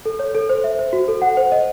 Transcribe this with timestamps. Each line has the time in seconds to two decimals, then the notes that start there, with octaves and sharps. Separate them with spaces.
0.06 A4
0.19 C#5
0.35 A4
0.49 C5
0.64 E5
0.79 C5
0.93 F#4
1.08 A4
1.22 F#5
1.37 C5
1.52 D#5